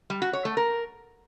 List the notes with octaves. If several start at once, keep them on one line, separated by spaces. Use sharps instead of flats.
G3
F#4
C#5
A3
A#4